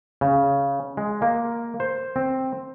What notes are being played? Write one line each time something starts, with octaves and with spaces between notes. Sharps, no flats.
C#3
G#3
A#3
C5
C4